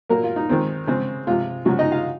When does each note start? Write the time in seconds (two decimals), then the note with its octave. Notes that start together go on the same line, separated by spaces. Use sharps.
0.09 A#2 F#3 A#3 A#4
0.24 F4
0.36 D#4
0.49 D#3 G#3 C4
0.87 C#3 G#3 C4
1.27 C3 F3 G#3 F4
1.65 C#3 F3 F#3 G#3 F#4
1.79 D#4 D#5
1.91 F4 F5